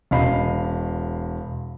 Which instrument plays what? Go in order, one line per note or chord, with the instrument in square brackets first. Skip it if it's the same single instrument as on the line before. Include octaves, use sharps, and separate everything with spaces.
[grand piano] E1 C#4 D#5 F5 B5 C7